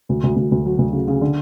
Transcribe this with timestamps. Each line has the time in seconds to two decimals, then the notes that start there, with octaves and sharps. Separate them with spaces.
0.09 D2
0.23 D2
0.36 D2
0.52 D2
0.66 F#3
0.79 D2
0.93 C#3
1.08 C#3
1.21 D3